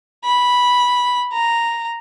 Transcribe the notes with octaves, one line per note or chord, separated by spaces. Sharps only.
B5
A#5